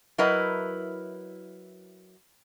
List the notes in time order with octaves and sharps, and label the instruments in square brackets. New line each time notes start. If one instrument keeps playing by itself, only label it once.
[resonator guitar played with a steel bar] F#3 E4 A#4 B4 D#5